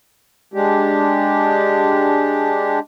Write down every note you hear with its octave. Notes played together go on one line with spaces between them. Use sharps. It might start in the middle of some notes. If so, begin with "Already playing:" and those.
G#3 D4 G4